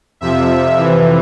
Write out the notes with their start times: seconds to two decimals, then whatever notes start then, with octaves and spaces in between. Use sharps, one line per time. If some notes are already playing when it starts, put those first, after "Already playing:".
0.21 F2 C3 F3 E5
0.78 F2 C3 E3